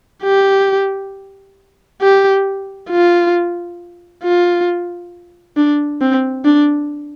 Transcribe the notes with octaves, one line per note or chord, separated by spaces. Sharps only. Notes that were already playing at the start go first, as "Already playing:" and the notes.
G4
G4
F4
F4
D4
C4
D4